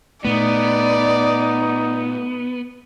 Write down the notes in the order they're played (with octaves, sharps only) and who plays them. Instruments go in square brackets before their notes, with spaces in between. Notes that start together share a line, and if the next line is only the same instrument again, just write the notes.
[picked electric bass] A#2 A3 [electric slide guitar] B3 [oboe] D#4 [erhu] D5